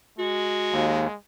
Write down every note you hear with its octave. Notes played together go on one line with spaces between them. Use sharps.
G#3 F#4
D#2